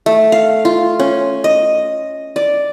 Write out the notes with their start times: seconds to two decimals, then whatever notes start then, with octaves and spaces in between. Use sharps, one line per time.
0.06 A3
0.32 F5
0.65 F4
1.00 C#4
1.44 D#5
2.36 D5